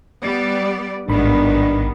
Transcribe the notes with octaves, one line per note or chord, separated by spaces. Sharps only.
G3 B3 D5
A1 G#2 D#3 G3 B3 D4 B5